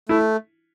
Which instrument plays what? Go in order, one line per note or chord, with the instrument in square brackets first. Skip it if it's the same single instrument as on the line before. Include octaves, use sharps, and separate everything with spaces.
[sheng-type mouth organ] A3 [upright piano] E4